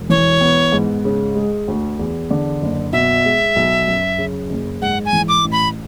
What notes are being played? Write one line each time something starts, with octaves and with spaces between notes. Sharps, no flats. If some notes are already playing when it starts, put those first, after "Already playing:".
Already playing: E1
E3 C#5
B3
G#2
C#3
G#3
D2
E2
D3
F#1
B2 E5
G#3
B1
F#2
C#3
F#1
G#2 F#5
G#5
E3
D6
A1
B5